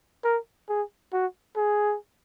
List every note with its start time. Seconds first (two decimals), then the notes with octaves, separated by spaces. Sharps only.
0.24 A#4
0.69 G#4
1.13 F#4
1.57 G#4